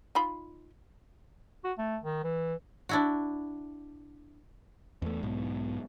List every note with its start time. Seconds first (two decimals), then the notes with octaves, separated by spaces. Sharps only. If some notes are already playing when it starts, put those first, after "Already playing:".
0.15 D#4 F4 B5
1.64 F#4
1.78 A3
2.03 D#3
2.24 E3
2.89 D4 E4 F#4
5.02 E2 A3
5.23 B1 G#2 B2